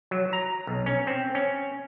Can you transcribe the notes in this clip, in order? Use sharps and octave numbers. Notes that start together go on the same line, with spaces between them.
F#3
A#5
B1
C#4
C4
C#4